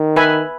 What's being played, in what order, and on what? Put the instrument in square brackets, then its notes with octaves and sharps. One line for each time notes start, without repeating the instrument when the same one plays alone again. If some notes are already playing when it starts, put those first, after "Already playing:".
Already playing: [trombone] D#3
[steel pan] B4 E5 G#5 B5